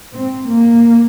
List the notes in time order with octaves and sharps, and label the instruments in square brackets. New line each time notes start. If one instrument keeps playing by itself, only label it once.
[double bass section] G#2 C4
G#2 A#3